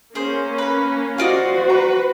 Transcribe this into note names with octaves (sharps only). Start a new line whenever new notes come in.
A#3 C#4 G#4 C5
B4 B5
F4 F#4 C5 D5 D#5
B4 A#5